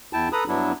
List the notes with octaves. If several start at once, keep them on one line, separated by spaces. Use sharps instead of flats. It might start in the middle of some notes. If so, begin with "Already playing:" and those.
E2 E4 G5 A5
A4 B4 A#5 B5 D#6
G2 F#3 B3 D4 E4